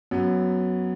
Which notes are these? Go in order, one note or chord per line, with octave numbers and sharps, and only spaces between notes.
F#2 F#3 B3